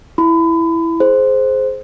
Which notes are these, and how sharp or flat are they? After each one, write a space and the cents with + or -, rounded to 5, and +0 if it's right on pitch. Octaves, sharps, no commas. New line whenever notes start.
E4 +0 B5 +35
G#4 +20 C5 +0